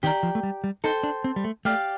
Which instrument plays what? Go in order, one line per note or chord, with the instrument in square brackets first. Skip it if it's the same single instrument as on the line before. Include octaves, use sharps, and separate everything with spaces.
[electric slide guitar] D#3 [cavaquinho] G4 D5 G5 A#5
[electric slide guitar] F3
A3
G3
G3
[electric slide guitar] D#4 [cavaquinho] A4 C5 G5
[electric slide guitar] D4
C4
G3
A3
[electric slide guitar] A3 [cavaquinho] G4 D5 F5